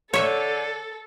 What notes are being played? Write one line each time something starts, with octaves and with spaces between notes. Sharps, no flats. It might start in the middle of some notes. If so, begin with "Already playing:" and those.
D3 A4 C#5 E5